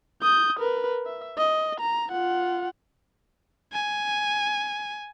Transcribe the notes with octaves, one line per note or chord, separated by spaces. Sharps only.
D#6 G6
A#4 B4
E5
D#5
A#5
F4 F#5
G#5